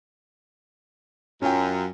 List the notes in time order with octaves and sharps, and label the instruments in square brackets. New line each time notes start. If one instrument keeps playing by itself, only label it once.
[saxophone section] F#2 [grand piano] C#4 F4 G5